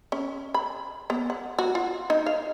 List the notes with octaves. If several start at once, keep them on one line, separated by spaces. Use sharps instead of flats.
C#4
B5
B3
F#5
F#4
F4
D#4
F5